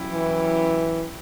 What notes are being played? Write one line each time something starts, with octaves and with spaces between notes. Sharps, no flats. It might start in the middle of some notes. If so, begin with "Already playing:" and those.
Already playing: F#3 C#4 E4 G4
E3